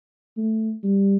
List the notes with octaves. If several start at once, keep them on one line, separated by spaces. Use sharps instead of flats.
A3
G3